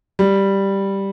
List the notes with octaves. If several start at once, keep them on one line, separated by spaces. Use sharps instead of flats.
G3